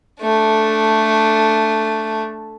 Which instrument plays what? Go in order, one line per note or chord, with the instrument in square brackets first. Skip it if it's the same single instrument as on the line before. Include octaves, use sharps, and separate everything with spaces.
[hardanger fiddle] A3 D4